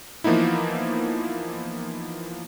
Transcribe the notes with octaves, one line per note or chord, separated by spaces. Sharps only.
E3 F3 A#3 B3 D#4 E4